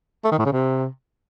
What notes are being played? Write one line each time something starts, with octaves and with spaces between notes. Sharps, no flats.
A3
D#3
A2
C#3
C3